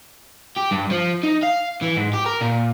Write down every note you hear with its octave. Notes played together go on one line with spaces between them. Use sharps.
G4
G2
F3
D#4
F5
E3
G#2
G4
A#4
A#2